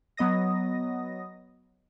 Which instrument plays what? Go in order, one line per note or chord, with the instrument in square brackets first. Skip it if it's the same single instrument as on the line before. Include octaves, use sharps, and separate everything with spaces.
[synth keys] F#3 B3 D#5 D#6 A#6